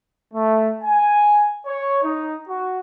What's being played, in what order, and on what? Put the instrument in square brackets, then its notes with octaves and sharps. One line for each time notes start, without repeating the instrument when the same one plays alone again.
[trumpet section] A3
G#5
C#5
D#4
F#4